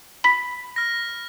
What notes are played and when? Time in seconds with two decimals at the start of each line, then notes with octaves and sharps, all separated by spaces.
0.24 B5 B6
0.76 F6 A#6